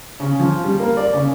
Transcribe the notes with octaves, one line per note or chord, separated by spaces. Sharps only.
C#3
F3
G3
A#3
D5
C#3